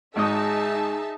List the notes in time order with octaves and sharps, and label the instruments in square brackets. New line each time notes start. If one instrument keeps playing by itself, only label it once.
[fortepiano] G#1 G#2 D#5 [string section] D#4 E5 A5 [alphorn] G#4